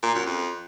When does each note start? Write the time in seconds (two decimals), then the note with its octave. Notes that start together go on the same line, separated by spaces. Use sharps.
0.03 A#2
0.15 F#2
0.26 F2